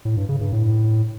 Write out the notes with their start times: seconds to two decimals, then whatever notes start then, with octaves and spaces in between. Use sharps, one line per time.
0.05 A2
0.17 G2
0.29 C#3
0.41 G2
0.53 A2